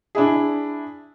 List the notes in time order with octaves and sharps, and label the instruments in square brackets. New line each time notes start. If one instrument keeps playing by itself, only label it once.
[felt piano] D4 E4 G#4